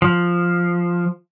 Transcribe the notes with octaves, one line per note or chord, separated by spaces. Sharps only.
F3